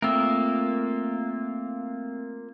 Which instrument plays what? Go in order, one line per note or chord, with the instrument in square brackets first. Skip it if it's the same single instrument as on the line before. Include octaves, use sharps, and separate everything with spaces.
[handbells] A3 C4 E6 [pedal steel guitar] A#3 F4 A#4